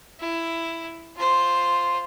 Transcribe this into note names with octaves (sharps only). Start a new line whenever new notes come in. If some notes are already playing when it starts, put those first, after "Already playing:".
E4
F4 C5